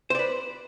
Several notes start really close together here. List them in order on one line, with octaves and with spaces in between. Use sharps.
C5 D5 B4